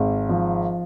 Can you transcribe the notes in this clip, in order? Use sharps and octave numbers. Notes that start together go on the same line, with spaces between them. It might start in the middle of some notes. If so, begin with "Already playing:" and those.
Already playing: G#1
F3